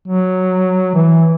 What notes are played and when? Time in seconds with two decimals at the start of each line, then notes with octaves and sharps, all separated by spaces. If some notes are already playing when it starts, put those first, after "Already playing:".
0.08 F#3
0.95 E3